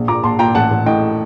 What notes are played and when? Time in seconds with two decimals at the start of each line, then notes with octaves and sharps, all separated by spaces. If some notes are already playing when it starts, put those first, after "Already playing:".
Already playing: A#1
0.08 A#2 A#5 D6
0.24 A#1 A5 C6
0.39 A#2 G5 A#5
0.55 A1 F#5 A5
0.71 A1
0.86 A2 D#5 G5